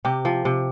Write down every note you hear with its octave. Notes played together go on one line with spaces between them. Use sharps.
C3 G4
F3
C3